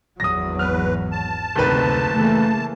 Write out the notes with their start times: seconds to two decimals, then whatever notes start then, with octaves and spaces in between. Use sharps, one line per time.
0.20 G#1 E2 F#3 D#6 A#6
0.59 B4 F6
1.12 A5
1.56 F#1 D2 C3 D#3 B4
2.13 C#3 E3 A3 A#3